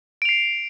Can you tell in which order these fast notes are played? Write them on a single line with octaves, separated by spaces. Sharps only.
D7 F7 C7